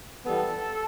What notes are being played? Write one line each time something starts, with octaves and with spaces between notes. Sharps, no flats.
E3 G3 B3 A4